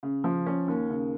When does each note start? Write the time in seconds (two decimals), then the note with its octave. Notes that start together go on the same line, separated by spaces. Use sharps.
0.03 C#3
0.24 F3
0.46 C#4
0.68 D#2
0.90 C#3